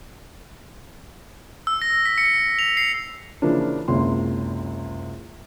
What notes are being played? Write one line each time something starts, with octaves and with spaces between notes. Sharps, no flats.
E6
A#6
B6
C#7
F7
C7
C#3 E3 F3 A#3 D4
F#1 C#2 C3 C6